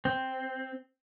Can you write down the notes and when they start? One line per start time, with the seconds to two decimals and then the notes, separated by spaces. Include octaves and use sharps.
0.05 C4